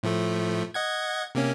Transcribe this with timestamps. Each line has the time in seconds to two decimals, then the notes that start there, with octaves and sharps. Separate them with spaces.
0.03 A2 F3 A3
0.74 D#5 F#5 G#6
1.35 C3 A#3 C#4